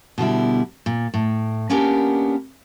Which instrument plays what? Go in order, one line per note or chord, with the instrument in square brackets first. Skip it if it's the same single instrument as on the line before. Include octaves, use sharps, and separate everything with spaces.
[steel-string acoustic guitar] B2 D3 G3 E4
A#2
A2
A#3 B3 C#4 D4 G4 A#4